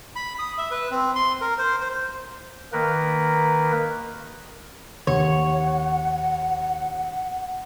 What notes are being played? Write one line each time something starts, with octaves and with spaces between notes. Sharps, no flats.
B5
D#6
E5
B4
C4
C6
A#4
C5
C5
D#3 A#3 A#4 B4
D#2 C#5 F#5